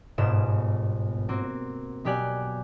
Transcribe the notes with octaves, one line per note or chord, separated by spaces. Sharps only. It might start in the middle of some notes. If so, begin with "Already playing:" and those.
G1 G#2 B2 A#3 E7
A#3 C4 F#4
B2 F#3 G4 D5 G#5 F#6